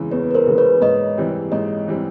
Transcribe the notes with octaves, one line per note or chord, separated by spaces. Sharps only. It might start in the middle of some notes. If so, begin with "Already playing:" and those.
Already playing: E2 C#3 E3 G#3
E2 B4 C#5
B4
A#4 C5
C#3 E3 G#3
B4 C#5
G#2 C#5 D#5
E3 G3 C4
G#2 C#5 D#5
E3 G3 C4